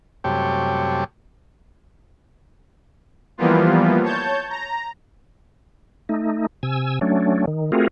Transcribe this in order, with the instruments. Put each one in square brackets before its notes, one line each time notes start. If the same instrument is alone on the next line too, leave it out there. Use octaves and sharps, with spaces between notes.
[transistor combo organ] F#2 C3 G3 A3 G4 C#5
[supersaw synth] E3 F3 G3 A#3 B3 F4
C#5 A5 G6
A#5
[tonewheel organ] A3 D#4
C3 G#5 E6
F#3 A3 C#4 D4
D#3
A3 C4 F4 F#4 G#4 A#4